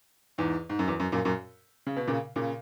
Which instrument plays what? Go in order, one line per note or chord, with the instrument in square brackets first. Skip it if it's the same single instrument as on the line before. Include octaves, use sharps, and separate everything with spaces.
[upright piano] E2 G#2
G#2
F#2
E2
F#2
F#2 A#2
F#2 A#2
C#3
B2
A#2 C#3
A#2 C#3